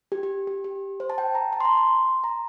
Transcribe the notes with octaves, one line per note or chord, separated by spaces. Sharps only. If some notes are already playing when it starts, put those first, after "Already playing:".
G4
G4
G4
G4
C5
A5
G5
A#5
A5
C6
A#5
C6
A#5